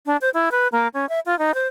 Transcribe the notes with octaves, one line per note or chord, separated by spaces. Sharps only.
D4
C5
E4
B4
A#3
C#4
E5
F4
D#4
C5